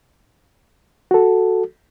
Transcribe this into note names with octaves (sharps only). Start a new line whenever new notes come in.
F#4 A4